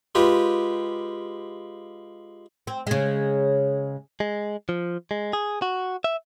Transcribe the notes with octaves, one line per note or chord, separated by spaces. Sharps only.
G#3 F4 G4 B4
C4
C#3 G#3
G#3
F3
G#3
G#4
F#4
E5